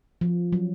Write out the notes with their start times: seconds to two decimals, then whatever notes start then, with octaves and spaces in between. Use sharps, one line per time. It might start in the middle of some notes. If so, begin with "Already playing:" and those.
0.21 F3
0.52 F#3